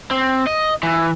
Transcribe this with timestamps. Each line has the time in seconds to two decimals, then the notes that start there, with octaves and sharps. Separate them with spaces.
0.11 C4
0.47 D#5
0.83 E3